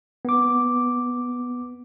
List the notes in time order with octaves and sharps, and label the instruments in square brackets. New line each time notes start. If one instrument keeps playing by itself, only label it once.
[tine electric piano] B3 D6